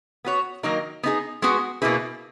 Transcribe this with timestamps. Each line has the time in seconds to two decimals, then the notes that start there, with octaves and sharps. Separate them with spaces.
0.24 B3 F#4 C#5
0.63 D#3 F#3 A#3 D#4 A#4
1.03 B3 D#4 G#4
1.42 G#3 B3 F#4
1.82 B2 A#3 E4 G#4 B4